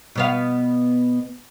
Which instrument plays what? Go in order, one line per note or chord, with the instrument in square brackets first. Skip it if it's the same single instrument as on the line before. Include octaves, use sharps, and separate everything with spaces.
[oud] B2 B3 F5